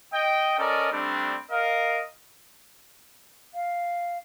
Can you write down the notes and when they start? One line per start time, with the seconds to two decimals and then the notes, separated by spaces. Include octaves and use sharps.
0.13 D#5 G5
0.58 C#4 A4 A#4 D5 D#5
0.92 G3 A3 C4 D4
1.50 A#4 D#5 F5
3.54 F5